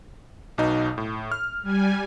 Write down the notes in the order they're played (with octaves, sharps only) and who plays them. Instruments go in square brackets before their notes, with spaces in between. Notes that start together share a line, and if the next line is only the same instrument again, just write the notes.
[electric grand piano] B1 B2 D#4
A2
F6
[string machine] G3 G#5